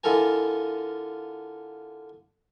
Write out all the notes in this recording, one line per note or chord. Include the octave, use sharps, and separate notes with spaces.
D3 E4 F4 A4 A#4 G#5